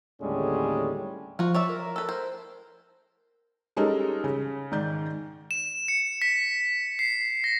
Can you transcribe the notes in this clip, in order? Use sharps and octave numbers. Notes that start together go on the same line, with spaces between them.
D#2 A2 D3 G3 G#3 C#4
F3 F4 F#4
C#5 D5 E5
A#4
A4 B4
C5
G3 G#3 C#4 D#4 A4 A#4
C#3
G#2 D#3 D5 G6
E7
C#7
B6
C7
A#6